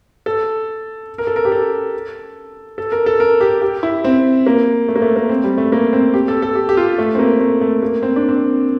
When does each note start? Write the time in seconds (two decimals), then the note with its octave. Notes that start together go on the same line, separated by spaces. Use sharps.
0.26 A4
1.18 A#4
1.27 A4
1.36 A#4
1.45 G4
1.52 A4
2.78 A4
2.92 A#4
3.06 A4
3.20 A#4
3.41 G4
3.62 G4
3.83 E4
4.04 C4
4.46 A#3
4.88 A3
4.96 A#3
5.02 A3
5.16 A#3
5.29 C4
5.44 G3
5.58 A3
5.72 A#3
5.93 C4
6.14 G4
6.28 A4
6.42 A4
6.55 G4
6.69 G4
6.77 F4
6.98 A3
7.15 C4
7.19 A#3
7.40 A3
7.61 A3
7.82 A#3
8.03 C4
8.16 D4
8.29 C4